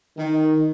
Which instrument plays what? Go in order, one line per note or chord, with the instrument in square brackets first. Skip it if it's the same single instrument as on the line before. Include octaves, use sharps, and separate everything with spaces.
[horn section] D#3